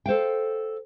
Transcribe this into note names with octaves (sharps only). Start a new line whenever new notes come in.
A4 C5 F5 G5